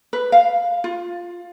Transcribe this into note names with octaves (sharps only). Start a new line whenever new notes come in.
B4
F5
F4